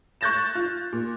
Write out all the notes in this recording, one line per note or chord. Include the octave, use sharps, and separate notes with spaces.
C#6 F#6 G6 A6 A#6 E7
F4
A#2